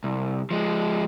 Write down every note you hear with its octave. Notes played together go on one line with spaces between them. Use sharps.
C2
F3 G#3